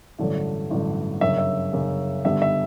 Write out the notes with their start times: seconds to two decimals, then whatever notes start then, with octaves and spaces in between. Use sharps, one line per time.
0.19 A1 G2 D3 F#3 A3
0.70 A1 G2 D3 F#3 A3
1.21 G1 F#2 C#3 E5
1.38 E5
1.73 G1 F#2 C#3
2.24 G2 D3 G3 B3 E5
2.42 E5